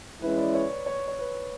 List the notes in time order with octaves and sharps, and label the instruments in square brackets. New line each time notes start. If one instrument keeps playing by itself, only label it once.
[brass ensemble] E3 G#3 C#4 E4 [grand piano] B4
[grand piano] D5
C#5
C#5
C#5
B4